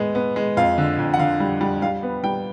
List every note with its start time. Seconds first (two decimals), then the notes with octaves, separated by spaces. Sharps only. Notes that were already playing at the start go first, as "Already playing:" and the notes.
Already playing: A2 G#3 B3
0.15 B3
0.36 G#3
0.57 F2 F5
0.78 D3
0.99 F2
1.14 F#5
1.19 D3 F5
1.40 G3
1.61 G3
1.82 G3 F5
2.03 B3
2.24 G3 G5